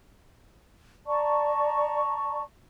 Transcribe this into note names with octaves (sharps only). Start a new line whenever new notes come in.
D5 A5 A#5 C#6